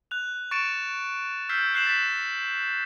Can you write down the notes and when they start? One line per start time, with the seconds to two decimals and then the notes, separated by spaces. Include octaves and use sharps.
0.11 F#6 F7
0.51 C#6 A6 C#7 D7 E7
1.49 E6 F6 G6 B6 C7
1.74 F#6 C7 E7 F#7
1.87 A6 B6